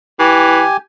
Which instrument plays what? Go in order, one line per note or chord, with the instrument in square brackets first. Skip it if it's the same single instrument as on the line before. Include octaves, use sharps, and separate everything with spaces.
[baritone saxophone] E3 [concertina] G4 G#5